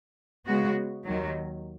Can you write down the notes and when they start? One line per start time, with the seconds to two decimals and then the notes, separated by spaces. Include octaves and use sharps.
0.46 C#3 G#3 B3 F#4
1.05 D#2 D#3 F#3